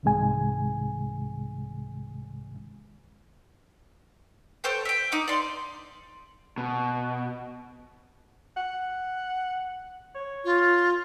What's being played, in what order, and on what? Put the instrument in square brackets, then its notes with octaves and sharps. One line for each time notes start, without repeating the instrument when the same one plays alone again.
[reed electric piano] C2 G#2 C3 D#3 G#3 G#5
[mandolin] A4 C5 C#5 G5
E5 G5
D#4 D6
D5 F5 C6
[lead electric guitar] B2
[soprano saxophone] F#5
C#5
[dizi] F4